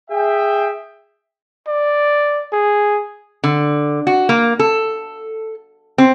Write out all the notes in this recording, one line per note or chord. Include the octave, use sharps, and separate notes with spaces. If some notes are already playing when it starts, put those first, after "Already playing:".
G#4 E5 G5
D5
G#4
D3
F#4
A#3
A4
C4